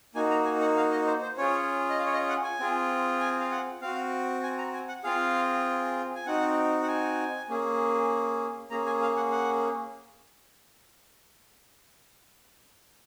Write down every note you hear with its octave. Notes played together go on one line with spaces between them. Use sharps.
A#3 D#4 F#4 G#5
A#5
G#5
F#5
F5
D#5
C5
C5
C#4 F4 G#4 C#5
D#5
F5
C#5
D#5
F#5
G#5
C4 F4 G#4
G#5
F5
F#5
C4 F#4 F5
G#5
A#5
G#5
F#5
C4 F4 G#4 F5
G#5
C4 D#4 F#4 F#5
F#5
G#5
A#3 C#4 G#4
A#3 C#4 G#4 A#5
G#5
F5
F#5
F#5